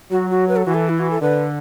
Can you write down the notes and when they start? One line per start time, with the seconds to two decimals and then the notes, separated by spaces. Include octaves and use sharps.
0.11 F#3 F#4
0.30 F#4
0.49 B4
0.56 A4
0.65 E3 F#4
0.74 A4
0.89 E4
1.00 F#4
1.11 A4
1.21 D3 B4